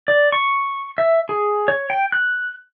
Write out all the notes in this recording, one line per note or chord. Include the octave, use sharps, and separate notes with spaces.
D5
C#6
E5
G#4
C#5
G5
F#6